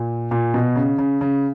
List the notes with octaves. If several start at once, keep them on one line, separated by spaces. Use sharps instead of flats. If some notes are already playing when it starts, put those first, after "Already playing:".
Already playing: A#2
A#2
B2
C#3
C#3
C#3